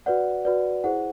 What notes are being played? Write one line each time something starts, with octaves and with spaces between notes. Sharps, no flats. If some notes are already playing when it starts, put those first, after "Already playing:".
F#4 B4 D5 F#5
F#4 B4 D5
E4 G#4 C5 F#5